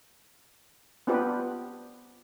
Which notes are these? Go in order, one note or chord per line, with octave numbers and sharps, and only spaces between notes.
B3 C4 D4 F4 G4 B4